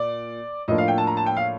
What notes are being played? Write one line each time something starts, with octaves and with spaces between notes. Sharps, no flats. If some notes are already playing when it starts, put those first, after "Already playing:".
Already playing: A#2 D5
A2 F3 A#3 D4 D#5
F5
G5
A5
A#5
A5
G5
F5